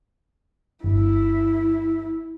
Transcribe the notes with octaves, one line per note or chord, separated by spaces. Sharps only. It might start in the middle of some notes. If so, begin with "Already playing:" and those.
G1 E4